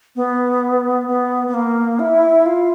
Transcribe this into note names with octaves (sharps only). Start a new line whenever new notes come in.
B3
B3
B3
A#3
E4
F4